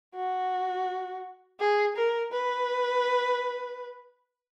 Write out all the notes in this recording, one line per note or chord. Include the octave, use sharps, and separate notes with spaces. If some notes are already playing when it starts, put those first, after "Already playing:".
F#4
G#4
A#4
B4